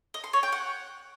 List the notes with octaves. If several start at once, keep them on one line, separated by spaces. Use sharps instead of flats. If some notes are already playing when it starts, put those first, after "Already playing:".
D#5
C6
C#5
G5
F#5